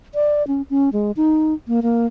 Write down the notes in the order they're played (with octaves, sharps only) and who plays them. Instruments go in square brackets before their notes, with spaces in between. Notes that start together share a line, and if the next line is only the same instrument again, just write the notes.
[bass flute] D5
C#4
C#4
G#3
D#4
A#3
A#3